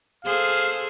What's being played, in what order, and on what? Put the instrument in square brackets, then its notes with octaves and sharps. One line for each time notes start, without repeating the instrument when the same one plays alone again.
[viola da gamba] G#4 A4 C5 [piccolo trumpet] F5